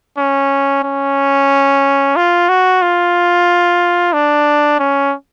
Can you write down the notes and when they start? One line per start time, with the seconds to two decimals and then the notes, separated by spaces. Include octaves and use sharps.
0.18 C#4
0.84 C#4
2.16 F4
2.49 F#4
2.82 F4
4.13 D4
4.79 C#4